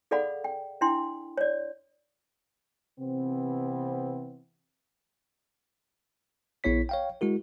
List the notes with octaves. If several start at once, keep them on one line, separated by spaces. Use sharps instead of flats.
G#4 A4 D5 F5 F#5 B5
G5
D4 E4 G5 C6
C#5 D5
C3 E3 B3 C4
A#1 B3 E4 C#5 B6
C#5 F5 G5
G#3 E4 F#4 A#4